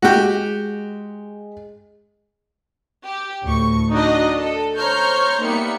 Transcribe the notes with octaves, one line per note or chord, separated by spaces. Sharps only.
G#3 F#4 G4
G4
D2 A2 C#6
D4 D#4 F#4 D5 D#5
A4
C5 C#5 A#5 C#6 F6 G6
G3 A#3 B3 D#4 E5 C#7